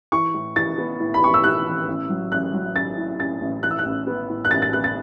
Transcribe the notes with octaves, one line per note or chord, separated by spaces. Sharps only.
E3 C#6
A2
E3 A6
B3
A2
B5
B3 C#6
E6
A2 F#6
E3
A1
F#3
A1 F#6
F#3
C#4 A6
A2
C#4 A6
A1
E3 F#6
E6
F#6
A1
B3
A2
F#6
A1 A6
A6
B3 F#6
A6